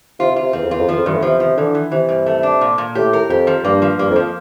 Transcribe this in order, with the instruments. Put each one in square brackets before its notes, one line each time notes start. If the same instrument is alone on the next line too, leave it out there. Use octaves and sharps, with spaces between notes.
[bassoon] C3 [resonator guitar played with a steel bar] F4
[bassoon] C3
[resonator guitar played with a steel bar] F4
[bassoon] C3
[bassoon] E2 [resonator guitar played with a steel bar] C4
[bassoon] F2
[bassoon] E2 [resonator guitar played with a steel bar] F4
[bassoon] F2
[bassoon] E2 [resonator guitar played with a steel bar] F3
[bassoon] F2
[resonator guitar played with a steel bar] E2 [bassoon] G2
[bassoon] A2
[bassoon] C3 [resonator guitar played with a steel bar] F3
[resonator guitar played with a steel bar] F3
[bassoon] C3
[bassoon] D3 [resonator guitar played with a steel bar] E3
[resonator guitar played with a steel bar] E3
[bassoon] C3 [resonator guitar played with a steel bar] E3
[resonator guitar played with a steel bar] G2
A3
D4
A#2
A#2
[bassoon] A2 [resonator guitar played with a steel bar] G4
[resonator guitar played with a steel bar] A#4
[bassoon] F2 [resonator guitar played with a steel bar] G4
[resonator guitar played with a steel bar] F3
[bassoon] G2 [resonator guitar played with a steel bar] A#3
[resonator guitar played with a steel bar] F3
[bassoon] G2 [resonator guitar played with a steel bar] A#3
[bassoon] F2
[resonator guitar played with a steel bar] F3